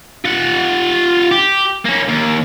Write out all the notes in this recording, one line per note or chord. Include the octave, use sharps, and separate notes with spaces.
F4 F#5
G4
A#3 C#4
D#2